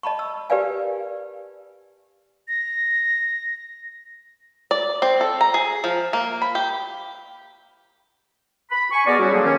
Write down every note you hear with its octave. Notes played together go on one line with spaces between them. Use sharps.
D#5 A5 B5 C#6
E6
G4 A#4 B4 D5 F5 G#5
A#6
D5
C4
A4
A#5
G#4
F3
A#3
B5
G4
B5
G#5 C#6
B2 B3 G#4 A#4 D5
F#3 G3 C#4 E4 F#4
D3 F#3 A#3 C4 D4 G#4
D#3 C#4